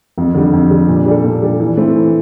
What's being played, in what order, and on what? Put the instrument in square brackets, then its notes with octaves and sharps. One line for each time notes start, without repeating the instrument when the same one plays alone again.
[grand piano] F2
D3 G3
F2
D3 G3
A#2
G3 D4 A4
A#2
G3 D4 A4
E3
A3 C4 E4
E3